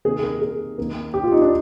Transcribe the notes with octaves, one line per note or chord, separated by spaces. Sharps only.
C3 D#3 A#3 G#4
A#4
G#4
D#3 A#3
G4
F4
D#4
D4